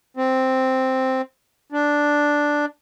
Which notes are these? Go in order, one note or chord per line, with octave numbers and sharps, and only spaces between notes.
C4
D4